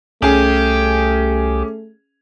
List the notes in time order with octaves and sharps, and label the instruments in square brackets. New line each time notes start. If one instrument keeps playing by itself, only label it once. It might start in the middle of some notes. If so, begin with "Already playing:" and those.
[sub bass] C2 [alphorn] A3 [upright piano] C#4 G#4 [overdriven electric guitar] G4